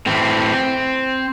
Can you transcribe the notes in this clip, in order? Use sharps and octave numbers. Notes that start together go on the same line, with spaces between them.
A2 E3 C4